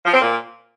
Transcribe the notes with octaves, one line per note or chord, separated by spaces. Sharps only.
F3
C4
A#2